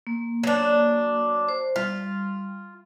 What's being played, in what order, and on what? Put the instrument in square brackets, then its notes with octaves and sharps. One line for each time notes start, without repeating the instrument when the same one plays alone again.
[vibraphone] A#3
[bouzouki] F#3 D4
[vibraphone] C5
[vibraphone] G3 [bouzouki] F4